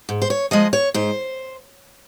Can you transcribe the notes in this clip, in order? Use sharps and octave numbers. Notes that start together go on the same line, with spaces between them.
G#2
C5
C#5
F3 G#3 D#5
C#5
G#2 C5